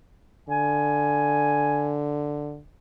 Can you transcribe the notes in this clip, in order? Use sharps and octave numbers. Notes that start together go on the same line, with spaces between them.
D3 G#5